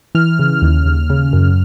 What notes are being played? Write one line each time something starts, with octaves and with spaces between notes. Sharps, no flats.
E3 F6
C#3
D#2
D#2
C#3
F#2